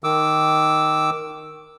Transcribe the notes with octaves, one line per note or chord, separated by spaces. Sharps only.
D#3 D6 E6